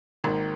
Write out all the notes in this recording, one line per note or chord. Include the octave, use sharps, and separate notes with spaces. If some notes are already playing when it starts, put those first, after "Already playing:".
G#1 G#2 D#3 A#3